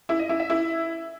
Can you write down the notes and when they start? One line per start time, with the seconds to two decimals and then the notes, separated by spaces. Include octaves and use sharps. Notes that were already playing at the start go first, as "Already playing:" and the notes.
0.09 E4
0.19 D#5
0.29 E4
0.40 E5
0.50 E4